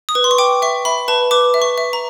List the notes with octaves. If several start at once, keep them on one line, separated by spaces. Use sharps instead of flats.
D#6
B4
C6
C#6
G5 D6
E5 C#6
E5 B5
B4 A5
B4 D6
E5
C#6
E5
A#5